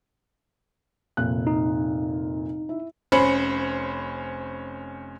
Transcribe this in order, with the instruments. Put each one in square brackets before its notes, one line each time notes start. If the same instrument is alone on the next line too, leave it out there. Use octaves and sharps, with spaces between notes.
[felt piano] F1 A#2 F#6
[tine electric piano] D#4
[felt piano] E4
[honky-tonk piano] F1 C#4 C5 B5 C#7